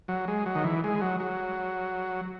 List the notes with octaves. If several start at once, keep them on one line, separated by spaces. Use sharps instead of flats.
F#3
G#3
F#3
D#3
E3
G#3
F#3
F#3